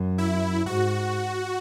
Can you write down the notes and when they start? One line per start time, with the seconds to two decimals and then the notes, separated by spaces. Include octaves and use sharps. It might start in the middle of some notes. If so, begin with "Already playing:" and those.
Already playing: F#2
0.18 E4
0.66 G#2 F#4